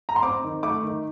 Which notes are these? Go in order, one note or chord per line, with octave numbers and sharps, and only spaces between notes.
A#5
C6
C4 D6
D#3
A3 D6
D#3